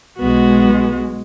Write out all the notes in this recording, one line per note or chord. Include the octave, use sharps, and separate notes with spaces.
B1 G#3 B3 F#4